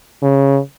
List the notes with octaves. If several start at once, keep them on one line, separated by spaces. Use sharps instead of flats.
C#3